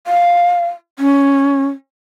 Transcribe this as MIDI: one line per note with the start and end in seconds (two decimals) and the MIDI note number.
0.07 0.67 77
0.99 1.66 61